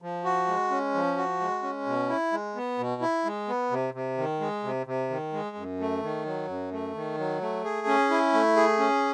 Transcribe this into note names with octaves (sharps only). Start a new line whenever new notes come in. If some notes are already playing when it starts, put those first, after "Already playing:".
F3
F#4
G#3
C#4
F3
F#4
G#3
C#4
B2
E4
G#3
B3
B2
E4
G#3
B3
C3
C3
D#3
G#3
C3
C3
D#3
G#3
F#2
A3
D#3
F#3
F#2
A3
D#3
F#3
A3
G#4
C#4
E4
A3
G#4
C#4